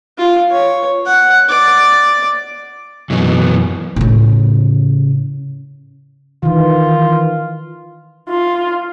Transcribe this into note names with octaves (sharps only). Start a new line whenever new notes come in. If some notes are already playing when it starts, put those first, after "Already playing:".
F4
C#5
F#5
D5
F#2 B2 E3
A2 C#3
D#3 E3 F4
F4